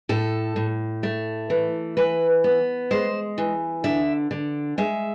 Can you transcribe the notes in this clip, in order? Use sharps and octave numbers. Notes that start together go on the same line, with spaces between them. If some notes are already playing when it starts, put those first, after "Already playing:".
A2 A4
A2
A3
E3
E3 B4
B3
G#3 C5
E3
D3 E5
D3
G#3 E5